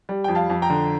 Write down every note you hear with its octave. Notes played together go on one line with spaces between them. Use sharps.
G3
F2 G5
F5 A5
F2
G5 A#5
D3